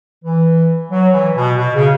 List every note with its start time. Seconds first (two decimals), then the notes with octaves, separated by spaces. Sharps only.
0.23 E3
0.91 F#3
1.12 E3
1.35 B2
1.57 B2
1.74 C#3